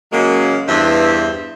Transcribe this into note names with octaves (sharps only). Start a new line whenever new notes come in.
C#3 F#3 G#3 A#3
E2 G2 E3 C5 E5